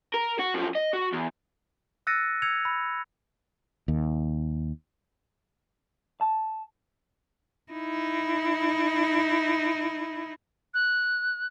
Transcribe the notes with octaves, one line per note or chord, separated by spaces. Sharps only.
A#4
F#4
F#2 F3
D#5
F#4
E2
E6 F#6 A6 A#6 C#7 D#7
E6 G#6 C#7 F7
B5
D#2
A5
D#4 E4
F#6